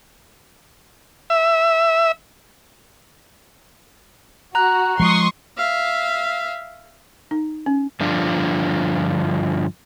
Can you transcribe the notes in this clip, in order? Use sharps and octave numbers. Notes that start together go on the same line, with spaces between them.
E5
F#4 A#5 F#6
F3 G#3 C6 C#6 D#6
E5 F5
D#4
C#4
G2 D3 F3 D4 F4